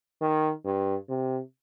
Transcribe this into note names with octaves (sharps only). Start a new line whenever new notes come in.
D#3
G2
C3